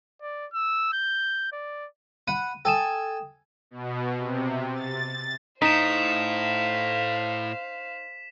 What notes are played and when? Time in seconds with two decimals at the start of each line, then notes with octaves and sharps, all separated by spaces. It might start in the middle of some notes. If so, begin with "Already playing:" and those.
0.22 D5
0.53 E6
0.93 G6
1.52 D5
2.28 F#5 B5 D#7
2.65 A4 G5 G#5 D#6 E7
3.71 B2
4.18 C3
4.73 A6
5.62 A2 D#4 C5 F5 B6 E7